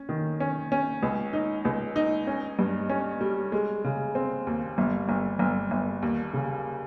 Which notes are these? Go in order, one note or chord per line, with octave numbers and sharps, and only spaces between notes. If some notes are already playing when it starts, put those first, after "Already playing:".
Already playing: C#4
D#3
C#4
C#4
C#2
D#4
C#2
D#4
C#4
G2
C#4
G3
G#3
C#3
C4
D#2
G1
G1
G1
G1
D#2
C#3